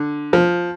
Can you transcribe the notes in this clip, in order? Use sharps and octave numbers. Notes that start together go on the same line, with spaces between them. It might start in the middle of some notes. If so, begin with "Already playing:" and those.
Already playing: D3
F3